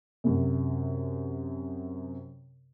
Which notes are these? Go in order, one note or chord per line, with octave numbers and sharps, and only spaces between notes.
F#2 C3